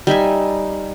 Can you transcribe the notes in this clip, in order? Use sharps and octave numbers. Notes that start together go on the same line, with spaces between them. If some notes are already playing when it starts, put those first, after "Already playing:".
G3 D#4 E5 G#5